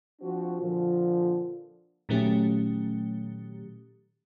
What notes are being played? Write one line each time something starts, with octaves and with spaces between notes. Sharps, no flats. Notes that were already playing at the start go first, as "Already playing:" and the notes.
F3 C4 D4 F#4
A#2 D3 F3
A#2 D#3 F#3 A3 C#4 G4